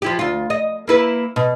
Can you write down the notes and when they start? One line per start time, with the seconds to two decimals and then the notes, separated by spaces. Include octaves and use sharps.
0.02 F3 E4 G4
0.19 D2 F4
0.50 D#5
0.88 A#3 E4 B4
1.36 B2